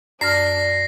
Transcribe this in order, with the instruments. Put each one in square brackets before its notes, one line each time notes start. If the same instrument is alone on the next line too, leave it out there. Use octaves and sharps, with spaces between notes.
[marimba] F#2 F6 [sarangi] D4 [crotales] A#6 C7